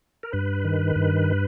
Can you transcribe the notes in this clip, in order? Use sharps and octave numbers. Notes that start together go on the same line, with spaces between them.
A#4
G2 B4
D#3
G2